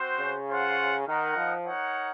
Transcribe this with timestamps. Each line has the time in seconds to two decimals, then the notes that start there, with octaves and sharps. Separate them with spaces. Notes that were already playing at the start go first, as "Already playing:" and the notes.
Already playing: C4 F#4 C5
0.19 C#3
0.48 F4 C5 F#5
1.07 D#3 D#4 A#4 D#5 F#5
1.36 F3
1.66 D#4 A#4 C#5 F#5